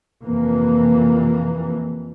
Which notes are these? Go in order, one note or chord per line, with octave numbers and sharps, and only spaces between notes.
F2 C3 E3 A#3